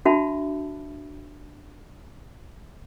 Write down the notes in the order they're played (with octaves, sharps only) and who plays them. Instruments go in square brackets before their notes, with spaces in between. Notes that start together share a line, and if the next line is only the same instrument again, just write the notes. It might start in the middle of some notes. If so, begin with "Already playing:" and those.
[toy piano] D4 F#4 E5 A5 B5